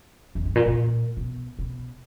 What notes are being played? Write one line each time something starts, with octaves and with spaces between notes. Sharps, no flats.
E2
G2
A#2
A#2
B2
B2